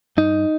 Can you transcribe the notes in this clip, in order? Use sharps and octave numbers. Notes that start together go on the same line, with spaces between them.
G2 D#4